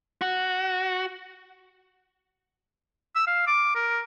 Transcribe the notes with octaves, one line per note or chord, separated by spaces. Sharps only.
F#4
E6
F5
D6
A#4